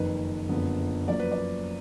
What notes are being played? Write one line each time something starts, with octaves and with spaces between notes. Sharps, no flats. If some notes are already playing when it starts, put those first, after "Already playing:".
Already playing: F#1 F2 D#3 B4
F#1 F2 D3 F3 B3
F#2 F3 A#3 D5
B4
D5